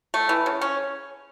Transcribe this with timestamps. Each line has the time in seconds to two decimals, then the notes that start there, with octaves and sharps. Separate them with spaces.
0.14 A3
0.29 E3
0.46 C#3
0.61 C#4